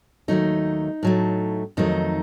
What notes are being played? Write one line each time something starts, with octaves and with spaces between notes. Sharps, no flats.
D#2 D#3 F#3 A3 D#4
A2 F#3 A3
F2 D#3 F#3 A3 D#4